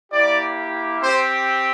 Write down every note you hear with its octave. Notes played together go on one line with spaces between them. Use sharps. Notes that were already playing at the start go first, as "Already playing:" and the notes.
A#3 E4 G4 D5
C4 G4 C5